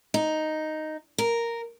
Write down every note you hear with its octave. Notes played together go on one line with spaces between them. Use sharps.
D#4
A#4